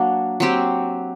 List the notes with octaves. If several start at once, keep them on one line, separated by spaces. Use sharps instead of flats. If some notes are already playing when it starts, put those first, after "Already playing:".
Already playing: F#3 A#3 D4 F#4
F#3 C4 G4